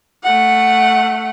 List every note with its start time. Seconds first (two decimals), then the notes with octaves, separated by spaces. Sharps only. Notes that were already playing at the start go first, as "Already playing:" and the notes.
0.23 A3 F#5